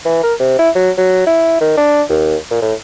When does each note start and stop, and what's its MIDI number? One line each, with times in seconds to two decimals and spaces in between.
0.05 0.20 52
0.23 0.34 70
0.40 0.58 48
0.59 0.70 64
0.75 0.90 54
0.98 1.24 54
1.27 1.56 64
1.61 1.74 51
1.77 2.03 62
2.09 2.36 39
2.51 2.62 46
2.62 2.74 45